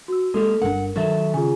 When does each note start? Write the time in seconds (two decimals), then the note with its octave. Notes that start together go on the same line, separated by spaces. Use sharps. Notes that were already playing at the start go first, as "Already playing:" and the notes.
0.08 F#4 E6
0.34 G#3 A#3 E4 G4 A4
0.62 G1 D4 A#4 F#5
0.96 D#3 F#3 A4 E5
1.34 C#3 F4 G#4 G#5